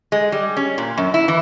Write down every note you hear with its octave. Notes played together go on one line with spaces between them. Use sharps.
G#3
G3
C#4
A#2
F#2
E4
E3